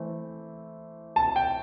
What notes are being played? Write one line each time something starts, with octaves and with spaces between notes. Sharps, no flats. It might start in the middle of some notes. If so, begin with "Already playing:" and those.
Already playing: E3 A3 C4
A5
G5